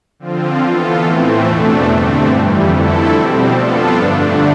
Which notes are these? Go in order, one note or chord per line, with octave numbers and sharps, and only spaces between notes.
D3 F3 C4 F4
E3 B3 F4 A4
A2 E3 A3 C4
E2 B2 A3 D4
G2 D3 A3 C4
F2 E3 G3
F2 D3 A3 E4 A4
B2 G3 C4
F3 B3 D4 F4 A4
G2 D3 A3 D4